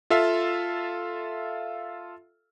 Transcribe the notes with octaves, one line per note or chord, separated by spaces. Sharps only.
F4 A4 E5 F5